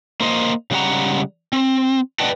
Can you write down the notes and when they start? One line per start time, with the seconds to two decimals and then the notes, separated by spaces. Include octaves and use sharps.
0.20 A#3 C5 D#5
0.71 C#3 G3 G#3 A4 F#5 A#5
1.53 C4
2.19 B4 D5 D#5 F#5 G5 A5